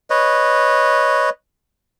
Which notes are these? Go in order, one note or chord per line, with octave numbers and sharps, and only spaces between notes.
B4 C#5 D#5